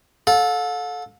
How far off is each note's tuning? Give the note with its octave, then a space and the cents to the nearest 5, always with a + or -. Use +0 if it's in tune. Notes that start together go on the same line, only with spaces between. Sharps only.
A4 -10 F5 +45